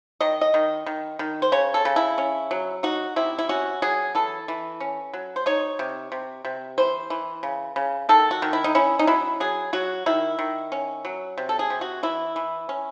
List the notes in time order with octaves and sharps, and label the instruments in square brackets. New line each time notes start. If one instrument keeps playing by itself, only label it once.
[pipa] D#3 D#5
D#5
D#3
D#3
D#3
C5
C#3 C#5
A4
C#3
E4
C#4
F#3
D#4 F#4
C3 E4
E4
C#4 F#4
F#3 G#4
E3 A4
E3
C#4
F#3
C5
D#4 C#5
C3
C3
C3
E3 C5
E3
C#3
C#3
D#3 A4
F#4
D#3
E4
D#4
C#4 E4
D#4
F#3 E4
F#3 G#4
F#3 F#4
D#3 E4
D#3
C#4
F#3
C3
A4
G#4
C3
F#4
E3 E4
E3
C#4